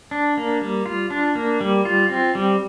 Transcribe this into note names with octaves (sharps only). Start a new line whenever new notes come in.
D4
A#3
G3
F4
D4
A#3
G3
F4
C4
G3